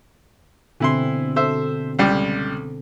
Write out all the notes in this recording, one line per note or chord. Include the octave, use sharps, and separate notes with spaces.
B2 D3 E3 C4 E4 C6
A4 C5 E5
C#2 G3 G5